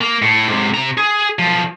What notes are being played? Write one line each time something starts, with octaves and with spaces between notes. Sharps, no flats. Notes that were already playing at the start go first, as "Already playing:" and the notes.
A#3
A2
G#2 C3
C3 A#5
G#4
B1 F3